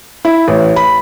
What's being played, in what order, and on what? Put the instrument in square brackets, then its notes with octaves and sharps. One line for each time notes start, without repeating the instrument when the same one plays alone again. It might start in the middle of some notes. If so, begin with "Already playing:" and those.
[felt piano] E4
A1
B5